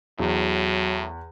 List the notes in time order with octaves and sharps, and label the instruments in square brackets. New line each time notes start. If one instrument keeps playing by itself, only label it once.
[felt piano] E2 [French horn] A2 [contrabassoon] F#3